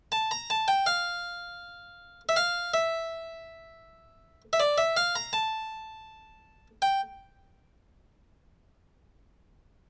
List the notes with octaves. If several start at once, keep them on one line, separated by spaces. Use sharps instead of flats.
A5
A#5
A5
G5
F5
E5
F5
E5
E5
D5
E5
F5
A#5
A5
G5